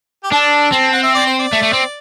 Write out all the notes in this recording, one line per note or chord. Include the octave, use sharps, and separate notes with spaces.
G4
D4 A4
C4
F#5
E5
D5
C5
D5
A3
A3
C4